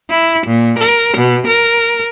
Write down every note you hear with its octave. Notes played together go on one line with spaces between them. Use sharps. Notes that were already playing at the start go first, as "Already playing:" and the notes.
E4
A#2
A#4
B2
A#4